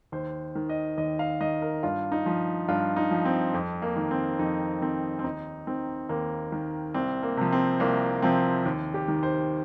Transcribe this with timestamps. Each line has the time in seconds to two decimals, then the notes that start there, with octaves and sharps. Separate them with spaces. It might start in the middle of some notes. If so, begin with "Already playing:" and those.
0.12 D#2 C5
0.55 D#3
0.69 D#5
0.97 D#2 D#5
1.19 F5
1.40 D#3 D#5
1.62 A#4
1.83 G2 F4
2.12 D#4
2.26 F3
2.68 G2 F4
2.96 D#4
3.11 F3
3.25 C4
3.54 F2
3.82 A#3
3.96 D#3
4.11 C4
4.39 F2 D#4
4.82 D#3 C4
5.19 C4
5.24 D#2 D#4
5.67 D#3 C4
6.09 D#2 A#3
6.52 D#3
6.94 C2 C4
7.23 A#3
7.37 C3 F3
7.52 C4
7.80 C2 A#3
8.22 C3 F3 C4
8.66 D#2
8.94 G4
9.08 D#3
9.23 C5